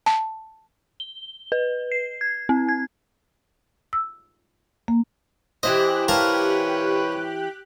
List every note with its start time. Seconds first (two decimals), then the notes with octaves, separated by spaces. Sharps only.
0.06 A5
1.00 G7
1.52 B4
1.92 C7
2.21 G#6
2.49 C4
2.69 G#6
3.93 E6
4.88 A#3
5.63 E3 E4 G4 C5 D#5 F#6
6.08 A#4 B4 C#5 F5 A5